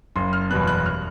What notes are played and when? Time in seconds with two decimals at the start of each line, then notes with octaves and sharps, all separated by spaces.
0.16 F#1 C6
0.33 F6
0.50 E2 B2 G3 B3 F#6
0.67 F#6
0.86 F6